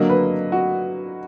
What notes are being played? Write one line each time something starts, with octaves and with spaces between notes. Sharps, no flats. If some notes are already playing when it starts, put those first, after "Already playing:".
Already playing: D3 F#3 A#3 D#5
B4
F#4